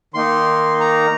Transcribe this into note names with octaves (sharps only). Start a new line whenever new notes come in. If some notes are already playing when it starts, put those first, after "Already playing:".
D#3 A#3 D#4 C6
A#5